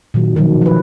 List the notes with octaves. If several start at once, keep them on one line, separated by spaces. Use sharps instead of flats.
A#2 D#3 F#3
B2 D#3 F3 F#3
F3 B4